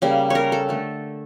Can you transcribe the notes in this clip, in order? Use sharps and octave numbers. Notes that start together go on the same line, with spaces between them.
C#3 G3 A#3
A#4 C#5
A4
D3 A3